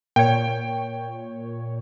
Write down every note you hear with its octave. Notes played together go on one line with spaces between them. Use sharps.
A#2 C#5 G5